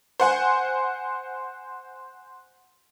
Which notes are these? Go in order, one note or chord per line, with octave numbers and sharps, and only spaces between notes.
C5 F#5 G#5